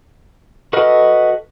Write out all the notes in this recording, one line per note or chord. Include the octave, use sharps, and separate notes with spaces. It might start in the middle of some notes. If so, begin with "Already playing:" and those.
F#4 A4 B4 D#5 F6